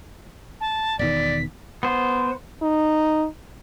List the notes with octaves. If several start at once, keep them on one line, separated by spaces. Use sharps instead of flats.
A5
E1 B2 D#3 D5 B6
B3 C5
D#4